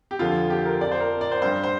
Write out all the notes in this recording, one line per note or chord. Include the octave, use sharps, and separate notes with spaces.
G4
F2 D3 F3 F4
G4
A#4
F2 F3 D5
C5
A#4
D5
C5
G2 G3 C5
C5